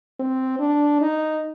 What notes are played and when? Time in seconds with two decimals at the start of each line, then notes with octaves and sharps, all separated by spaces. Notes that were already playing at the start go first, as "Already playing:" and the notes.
0.20 C4
0.59 D4
1.01 D#4